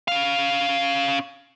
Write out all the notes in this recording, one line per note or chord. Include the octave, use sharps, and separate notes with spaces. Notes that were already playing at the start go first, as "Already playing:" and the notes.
C#4 F5